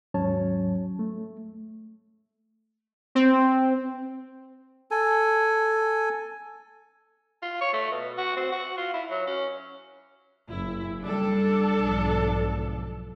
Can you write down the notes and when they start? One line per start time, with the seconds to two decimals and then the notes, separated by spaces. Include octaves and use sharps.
0.14 D#2 G#2 F#3 C#4 C#5 A5
0.99 A3
3.15 C4
4.91 A4 G#5
7.42 F4
7.61 C#5
7.73 A3
7.92 B2
8.17 F#4
8.37 C4
8.52 F#4
8.78 F4
8.94 E4
9.11 F#3
9.27 C#4
10.49 F#1 E4
11.03 F#1 G3 D4 A4
11.79 B1 G#2 F3